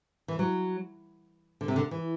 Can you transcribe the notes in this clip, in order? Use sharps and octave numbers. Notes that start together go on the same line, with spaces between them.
E3
F#3
D3
C3
D3
E3